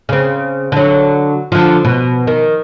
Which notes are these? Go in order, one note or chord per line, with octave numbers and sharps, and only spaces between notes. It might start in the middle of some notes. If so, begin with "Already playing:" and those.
C#3 C4
D3 F#3
D3 F3
B2
D#3